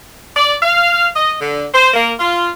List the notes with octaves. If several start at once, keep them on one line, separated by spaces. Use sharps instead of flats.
D5
F5
D#5
D3
C5
A#3
F4